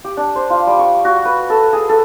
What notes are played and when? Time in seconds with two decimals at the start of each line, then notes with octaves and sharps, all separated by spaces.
0.04 G4
0.17 D4
0.35 C5
0.50 F4
0.67 G3
0.79 C#6
1.05 F#4
1.25 B4
1.50 A4
1.73 G#4
1.89 A4